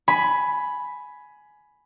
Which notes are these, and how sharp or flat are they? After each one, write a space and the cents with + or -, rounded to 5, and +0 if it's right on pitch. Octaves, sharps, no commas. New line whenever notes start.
G#5 +15 B5 +0